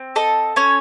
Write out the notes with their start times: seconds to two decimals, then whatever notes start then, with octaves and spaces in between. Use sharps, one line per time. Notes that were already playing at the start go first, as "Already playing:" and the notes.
Already playing: C4
0.16 A4 D#5
0.56 C#4 C#5